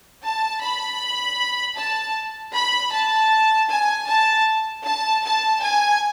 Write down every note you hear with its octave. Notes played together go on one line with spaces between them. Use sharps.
A5
B5
A5
B5
A5
G#5
A5
A5
A5
G#5